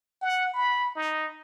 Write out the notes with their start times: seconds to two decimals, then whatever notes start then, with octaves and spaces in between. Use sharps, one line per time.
0.22 F#5
0.54 B5
0.95 D#4